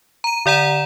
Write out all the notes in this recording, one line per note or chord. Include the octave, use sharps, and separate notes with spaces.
A#5 D#7
D3 D5 F#5 A#5 E7